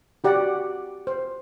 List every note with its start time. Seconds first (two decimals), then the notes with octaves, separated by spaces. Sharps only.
0.24 F#4 G4 D5 F#5
1.07 C5